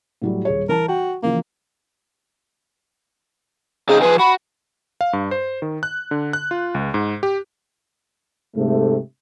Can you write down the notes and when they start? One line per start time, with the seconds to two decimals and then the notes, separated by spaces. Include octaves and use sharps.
0.22 A2 F#3 G3
0.45 D#1 G#4 C#5
0.69 E3 A#4 A5
0.88 F#4 G5
1.23 C#3 E3 F3 A#3
3.88 C#3 C4 D#4 G#4
4.01 F3 G#4 B4
4.19 F#4 B5
5.01 F5
5.13 G2
5.31 C5
5.62 D#3
5.83 F#6
6.11 D3
6.33 F#6
6.51 F4
6.75 C#2
6.94 G#2
7.23 G4
8.55 G#2 C3 A3